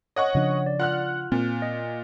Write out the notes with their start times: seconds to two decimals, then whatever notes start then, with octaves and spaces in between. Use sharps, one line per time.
0.16 C#5 D#5 F#5 C#6
0.35 C#3 F3 D4
0.66 D5
0.80 F4 F#5 F6 F#6
1.32 A#2 C4
1.62 D#5